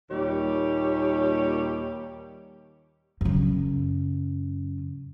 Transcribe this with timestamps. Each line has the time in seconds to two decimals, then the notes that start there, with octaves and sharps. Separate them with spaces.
0.11 D#2 A#2 D#3 G3 G4 C#5
3.21 F#2 C#3